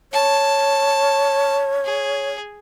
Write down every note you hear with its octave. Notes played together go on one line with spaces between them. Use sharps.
C#5 A5
G#4